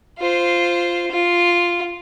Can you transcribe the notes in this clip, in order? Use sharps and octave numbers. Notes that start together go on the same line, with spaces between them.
F4 C5
F4